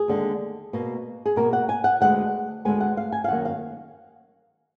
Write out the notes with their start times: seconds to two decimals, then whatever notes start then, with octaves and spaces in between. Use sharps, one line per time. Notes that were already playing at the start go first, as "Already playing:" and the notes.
Already playing: G#4
0.08 D#2 D3 G#3
0.73 B2 A#3
1.25 G#4
1.36 B2 A#3 A#4
1.53 F#5
1.69 G#5
1.84 F#5
2.01 D2 D3 G#3 B3 F#5
2.65 D2 D3 G#3 B3 G#5
2.81 F#5
2.97 F5
3.12 G#5
3.24 F5
3.28 F#2 D#3 A#3 F#5
3.45 F5